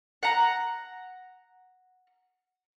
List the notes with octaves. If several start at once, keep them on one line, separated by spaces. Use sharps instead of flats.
F#5 A#5